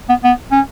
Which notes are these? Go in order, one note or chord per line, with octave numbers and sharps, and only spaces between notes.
B3
B3
C#4